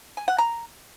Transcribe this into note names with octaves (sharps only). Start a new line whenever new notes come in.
G#5
F#5
A#5